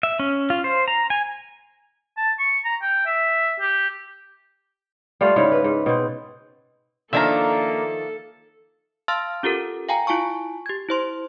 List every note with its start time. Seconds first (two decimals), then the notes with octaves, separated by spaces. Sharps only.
0.03 E5
0.20 C#4
0.50 F4
0.64 C5
0.88 A#5
1.10 G#5
2.17 A5
2.39 C#6
2.65 A#5
2.82 G5
3.06 E5
3.60 G4
5.21 G3 A3 F4 F5
5.36 G#2 C#3 E4 F5
5.52 B4
5.64 G#2
5.86 B2 C4
7.13 D#3 F3 A#3 D4 A4 E5 F5 A#5
9.08 F5 A5 C6 E6 F6 A6
9.43 C#4 F4 G4 A4 A#4
9.89 F5 G5 G#5 A#5
10.07 E4 F4 G#5 A5 C#6
10.66 G4 G#6
10.89 E4 C5 C6